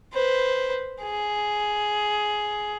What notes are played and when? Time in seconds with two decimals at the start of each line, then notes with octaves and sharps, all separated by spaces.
0.13 B4 C5
1.02 G#4